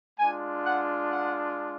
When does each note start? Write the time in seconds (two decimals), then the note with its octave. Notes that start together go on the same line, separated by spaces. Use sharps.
0.19 G#3 D4 F4 G#5
0.65 F#5
1.09 F#5